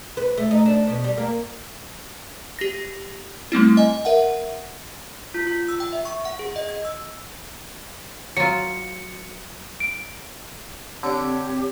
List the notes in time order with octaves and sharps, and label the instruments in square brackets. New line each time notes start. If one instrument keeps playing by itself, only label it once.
[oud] B4
A3
D#4
D4
B2
G3
A#3
[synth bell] G4 A#6
G3 A3 C4 E4
D#5 G#5
A#4 E5 F#5
[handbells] F4
F4
E6
G5
E5
C#6
F#5
G#4
D#5
G#6
E6
[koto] F#3 F4 [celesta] C#7
[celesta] D7
[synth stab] D3 C#7 D7 [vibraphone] C4 [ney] G4 [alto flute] C#5